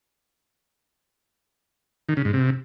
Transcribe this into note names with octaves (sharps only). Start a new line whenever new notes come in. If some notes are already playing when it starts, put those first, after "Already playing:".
D#3
C#3
G#2
C3